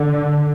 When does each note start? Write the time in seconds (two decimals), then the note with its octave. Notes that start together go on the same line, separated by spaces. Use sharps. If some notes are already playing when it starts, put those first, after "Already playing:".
Already playing: D3